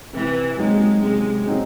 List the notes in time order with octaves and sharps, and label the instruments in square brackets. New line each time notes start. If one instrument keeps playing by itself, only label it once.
[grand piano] C3 [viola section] E3
[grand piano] F#3 C4 D#4 G#4 [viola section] G#3
[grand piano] C3 [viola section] G#3
[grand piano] F#3 C4 D#4 G#4